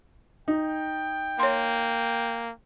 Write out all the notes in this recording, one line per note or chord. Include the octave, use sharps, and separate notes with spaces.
D#4 G5
A#3 C#5 C6